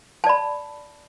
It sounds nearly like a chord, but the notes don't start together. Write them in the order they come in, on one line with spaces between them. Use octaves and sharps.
A5 D5 B5